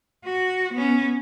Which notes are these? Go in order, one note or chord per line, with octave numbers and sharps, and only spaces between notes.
F#4
B3 C#4